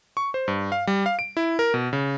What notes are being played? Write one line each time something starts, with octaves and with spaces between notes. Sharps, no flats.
C#6
C5
G2
F5
G3
F5
D7
E4
A#4
B2
C#3